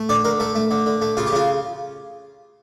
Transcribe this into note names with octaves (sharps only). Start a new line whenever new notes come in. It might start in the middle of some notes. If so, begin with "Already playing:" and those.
Already playing: A3
D3 D5
D3 A#4
A3 A4
A3
D3
D3
A3
C#3 F4
G4
C#3 F4